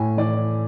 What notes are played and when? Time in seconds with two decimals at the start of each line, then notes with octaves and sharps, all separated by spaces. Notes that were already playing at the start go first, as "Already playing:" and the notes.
Already playing: A2 G#5
0.17 E3 D5